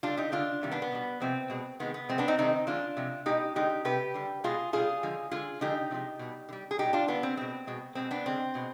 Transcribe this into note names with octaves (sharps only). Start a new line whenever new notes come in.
D3 G3 D4 F4
D#4 G4
D3 G#3 D4 F4
C3 D#3 G3
B3 D4
B3
B2 G3
C3 F3 G#3 C4
B2 G#3
C3 D#3 G#3 B3
B3
C3 F3 G#3 C4
B3 D4
C4 D#4
C3 D#3 G#3 C4 D#4
D3 F3 G#3 D4 F4
C3 F3 G#3
B2 G#3 D#4 G4
D3 G#3 D#4 G4
C3 G3 G4 B4
D3 G3
B2 G#3 F4 G#4
B2 G3 F4 G#4
D3 F3 G#3
D3 G#3 F4 G#4
D3 F3 G#3 D#4 G4
C3 F3 G#3
B2 G3
D3
G3
G#4
B2 G3 D#4 G4
D4 F4
D3 G3 B3 D4
C4
B2 G#3 C4
B2 G#3
B2 G#3 C4
B3 D4
D3 G#3 C4
B2 G#3